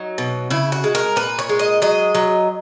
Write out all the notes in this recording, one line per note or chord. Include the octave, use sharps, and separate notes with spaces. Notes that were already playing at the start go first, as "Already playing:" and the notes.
Already playing: F#3 D#4
B2
C#3 E4
F#4
G#3
A#4
A#2 B4
C#5
G#3
D#5
F#3 D#5
F#3